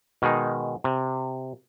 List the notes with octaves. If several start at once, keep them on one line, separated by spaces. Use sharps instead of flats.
B2 D#3 G#3 D#4
C3